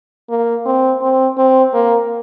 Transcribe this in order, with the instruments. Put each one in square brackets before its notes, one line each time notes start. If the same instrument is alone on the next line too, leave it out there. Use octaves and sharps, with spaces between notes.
[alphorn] A#3
C4
C4
C4
A#3